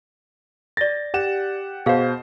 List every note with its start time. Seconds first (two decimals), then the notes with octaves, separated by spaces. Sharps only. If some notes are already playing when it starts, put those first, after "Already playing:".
0.77 D5 A6 A#6
1.14 G4 F#5 E7
1.86 B2 G#4 C5 F5